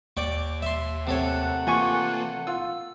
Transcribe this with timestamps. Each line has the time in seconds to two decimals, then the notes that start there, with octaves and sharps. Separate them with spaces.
0.17 D#2 D5 G5 C#6
0.62 E5 C6
1.07 C3 A3 A4 A#4 C#5 F#5
1.67 E3 A#3 F4 G4 G#5 C#6
2.47 F4 E6